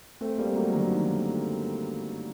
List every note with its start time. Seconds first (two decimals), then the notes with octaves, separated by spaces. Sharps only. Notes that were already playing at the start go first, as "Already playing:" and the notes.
0.21 A3 C4
0.38 G3 A#3
0.56 F#3 A3
0.73 D3 F#3
0.91 D#3